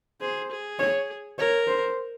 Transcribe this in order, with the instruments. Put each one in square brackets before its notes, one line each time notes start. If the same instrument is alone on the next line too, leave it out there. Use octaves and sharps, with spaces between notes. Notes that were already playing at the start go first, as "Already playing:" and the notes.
[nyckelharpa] G#4 [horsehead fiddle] C5
[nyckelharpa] G#4
[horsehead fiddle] C#5
[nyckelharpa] A#4 [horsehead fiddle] C#5
[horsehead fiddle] C5